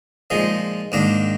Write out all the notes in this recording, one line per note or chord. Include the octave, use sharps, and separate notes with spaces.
A#2 F3 G#3 D#4
G#2 D#3 A#3 D4